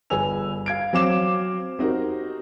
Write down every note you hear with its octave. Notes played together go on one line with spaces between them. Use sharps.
G1 G#4 B4 G#5 E6 F7
F5 G#6 D7
F#3 C4 F5 D6 E7
C4 D#4 F#4 G4 A#4